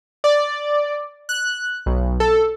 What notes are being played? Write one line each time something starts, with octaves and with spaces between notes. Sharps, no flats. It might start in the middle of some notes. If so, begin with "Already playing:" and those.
D5
F#6
B1
A4